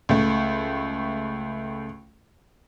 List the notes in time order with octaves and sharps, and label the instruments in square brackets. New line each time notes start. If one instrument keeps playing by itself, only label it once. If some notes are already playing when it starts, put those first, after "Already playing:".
[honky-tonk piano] C#2 A3